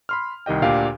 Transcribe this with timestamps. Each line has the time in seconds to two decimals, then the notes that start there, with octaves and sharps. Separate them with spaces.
0.09 B5 C6 F6
0.46 C2 D#3 G4 D#5 G5
0.62 D2 A#2 D4 G4 F5 G6